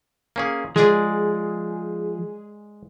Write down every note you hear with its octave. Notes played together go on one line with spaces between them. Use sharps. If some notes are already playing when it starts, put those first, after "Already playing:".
A#3 C#4 G#4
F3 G#3 G#4 D5